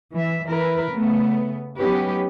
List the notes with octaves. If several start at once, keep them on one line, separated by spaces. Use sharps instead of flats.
E3 E5
E3 E4 A#4 B4
C#3 A3 B3
F#3 B3 C#4 D#4 G4 B4